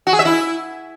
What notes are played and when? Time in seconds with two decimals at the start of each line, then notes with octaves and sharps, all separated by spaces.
0.07 F#4
0.13 G#4
0.19 E5
0.25 E4